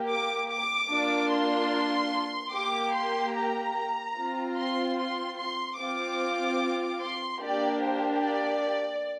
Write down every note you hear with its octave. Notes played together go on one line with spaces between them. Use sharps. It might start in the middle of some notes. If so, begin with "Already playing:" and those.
Already playing: A#3 G4
D6
D6
A#3 D4 F4
C6
A#3 G4 D6
C6
A#5
C4 F4
C6
C6
C6
C4 F4 D6
C6
A#3 D4 G4 D5
C5
D5